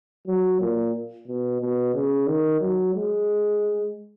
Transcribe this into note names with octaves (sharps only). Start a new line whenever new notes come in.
F#3
A#2
B2
B2
C#3
D#3
F#3
G#3